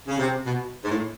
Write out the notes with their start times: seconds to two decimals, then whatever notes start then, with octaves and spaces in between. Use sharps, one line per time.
0.08 C#3
0.19 C3
0.45 B2
0.84 G#2
0.90 A2